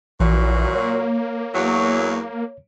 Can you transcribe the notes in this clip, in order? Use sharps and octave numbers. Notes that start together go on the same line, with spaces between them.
A#1 A#2 E3 F#3
A#3 C#5
E2 E3 F#3